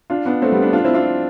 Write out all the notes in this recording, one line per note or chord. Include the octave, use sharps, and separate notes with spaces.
D4 F4
B3 D4
A3 C4
G3 B3
B3 D4
D4 F4
C4 E4
D4 F4